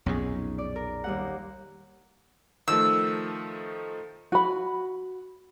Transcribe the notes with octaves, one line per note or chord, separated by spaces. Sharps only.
B1 F2 A#2 C#4 D#4 G#4
D5
A#4
D#2 G3 F#5
D#3 F3 A3 E6
F#4 B5